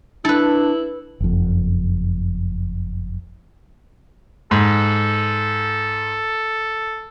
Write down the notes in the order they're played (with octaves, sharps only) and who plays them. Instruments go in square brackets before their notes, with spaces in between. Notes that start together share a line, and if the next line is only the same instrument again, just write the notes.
[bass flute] D4 [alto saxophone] E4 [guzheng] A4 B4
[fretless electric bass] F#1 F2
[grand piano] G#2 [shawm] A4